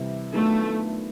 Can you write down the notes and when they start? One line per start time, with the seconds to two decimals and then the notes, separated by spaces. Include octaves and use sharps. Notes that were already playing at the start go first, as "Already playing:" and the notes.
Already playing: C3 E3 G3
0.33 D#3 F#3 A3 B3 D4 F4